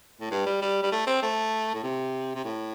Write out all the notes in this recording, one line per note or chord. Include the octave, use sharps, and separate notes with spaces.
A2
G2
G3
G3
G3
A3
C4
A3
A2
C3
C3
A2